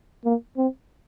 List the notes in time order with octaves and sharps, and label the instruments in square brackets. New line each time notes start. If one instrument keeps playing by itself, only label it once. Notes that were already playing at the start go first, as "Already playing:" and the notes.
[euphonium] A#3
C4